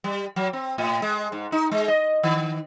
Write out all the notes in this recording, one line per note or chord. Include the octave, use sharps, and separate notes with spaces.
G3
F#3
C4
A2
G#3
G#2
D#4
G#3
D#5
D#3